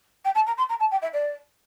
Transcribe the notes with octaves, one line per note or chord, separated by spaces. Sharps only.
G5
A5
A#5
C6
A#5
A5
G5
E5
D5